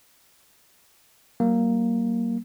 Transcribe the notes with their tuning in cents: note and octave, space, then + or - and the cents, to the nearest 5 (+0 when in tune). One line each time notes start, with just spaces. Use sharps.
F#3 +45 A#3 +0